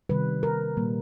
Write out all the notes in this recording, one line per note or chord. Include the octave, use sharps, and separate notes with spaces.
C3 D#3 G3 B4
A#4
A#2 G3 A#3